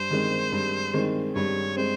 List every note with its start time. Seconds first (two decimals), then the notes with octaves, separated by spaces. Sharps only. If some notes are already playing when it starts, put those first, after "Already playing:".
Already playing: G2 C5
0.10 D#3 G#3 C4
0.52 G2
0.93 D#3 G#3 C4
1.35 G2 C#5
1.77 G#3 C4 C5